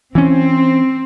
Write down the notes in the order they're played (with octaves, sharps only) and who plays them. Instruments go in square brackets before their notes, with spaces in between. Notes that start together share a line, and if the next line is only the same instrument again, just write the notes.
[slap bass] E3 C#4 [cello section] C4